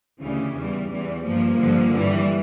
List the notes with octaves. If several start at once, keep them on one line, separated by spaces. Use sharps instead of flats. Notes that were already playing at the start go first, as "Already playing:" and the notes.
D2 C#3 E3 G3 C#4
E2 E3 G3
E2 E3 G3
G2 F3 A#3
G2 D3 F3
G2 E3 G3